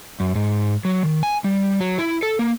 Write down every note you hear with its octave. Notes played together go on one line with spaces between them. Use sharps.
F#2
G#2
F#3
D#3
G#5
G3
F#3
E4
A4
A#3